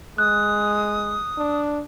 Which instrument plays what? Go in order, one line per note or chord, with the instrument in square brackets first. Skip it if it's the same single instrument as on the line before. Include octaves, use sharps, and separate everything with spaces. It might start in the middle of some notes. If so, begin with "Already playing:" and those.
[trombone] G#3 [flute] D#6 [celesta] F#6
[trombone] D4